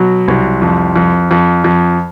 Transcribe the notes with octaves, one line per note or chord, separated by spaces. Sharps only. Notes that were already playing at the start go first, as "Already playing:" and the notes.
Already playing: B2 F#3
C2
F2
F2
F2
F2